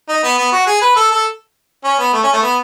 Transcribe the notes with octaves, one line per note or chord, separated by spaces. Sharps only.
D#4
B3
B3
F#4
G#4
B4
A4
A4
C#4
B3
A3
C#4
A3
B3